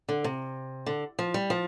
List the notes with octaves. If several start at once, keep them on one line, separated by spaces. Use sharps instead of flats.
D3
C3
D3
F3
G3
F3